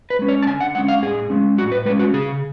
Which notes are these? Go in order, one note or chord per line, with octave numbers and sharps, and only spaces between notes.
B4
G#3 C#4
C#5
A5
D3 G#5
F#5
G#3 C#4 F#5
F5
A2 G#4
G#3 C#4
A2 F#4
B4
G#3 C#4 B4
F#4
C#3 G#4